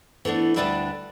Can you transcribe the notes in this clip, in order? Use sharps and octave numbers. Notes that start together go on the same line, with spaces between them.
E3 A3 B3 D4
D2 G3 D4 B4 D5 E5